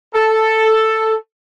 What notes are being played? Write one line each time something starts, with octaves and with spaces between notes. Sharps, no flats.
A4